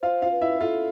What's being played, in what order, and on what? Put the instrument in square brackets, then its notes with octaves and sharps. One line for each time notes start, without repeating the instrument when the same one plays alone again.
[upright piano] F4 F5 [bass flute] C5
[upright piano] F4 F5
[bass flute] B4
[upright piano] E4 E5
[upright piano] F4 F5 [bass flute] A4